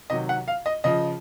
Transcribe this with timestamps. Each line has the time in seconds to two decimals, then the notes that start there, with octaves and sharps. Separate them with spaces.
0.10 C3 D#3 F#3 D#5
0.29 F#5
0.48 F5
0.66 D#5
0.84 C#3 F3 D#5